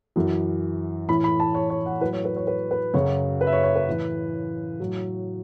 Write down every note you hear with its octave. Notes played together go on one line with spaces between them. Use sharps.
F#2 E3
A2 E3 B5
B5
A5
C#5
C#5
F#5
A2 F#3 B4
C#5
B4
C#5
B4
B4
F#2 C#3 F#3 C#5
B4
E5
C#5
C#5
B4
A2 E3
A2 F#3